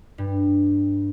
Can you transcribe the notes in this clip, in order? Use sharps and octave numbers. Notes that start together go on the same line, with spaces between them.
G2